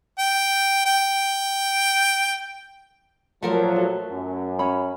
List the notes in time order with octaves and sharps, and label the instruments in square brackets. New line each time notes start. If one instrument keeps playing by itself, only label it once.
[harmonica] G5
G5
[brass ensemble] A#2 F3 F#3 [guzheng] A3 A#4 A#5 [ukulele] A5
[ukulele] F#4 A4
[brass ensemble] F#2
[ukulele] C#4 C#5 B5